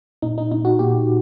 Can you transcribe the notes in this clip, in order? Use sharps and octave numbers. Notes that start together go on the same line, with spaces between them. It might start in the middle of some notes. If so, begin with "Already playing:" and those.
A#2 D#4
D#4
A#2 D#4
F#4
A#2 G4